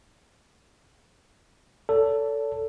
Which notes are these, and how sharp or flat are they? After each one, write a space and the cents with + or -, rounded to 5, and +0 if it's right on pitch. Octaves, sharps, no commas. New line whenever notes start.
A4 +15 C#5 +45